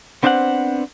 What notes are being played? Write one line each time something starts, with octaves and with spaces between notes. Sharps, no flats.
B3 C4 D4 C5 E5 F#5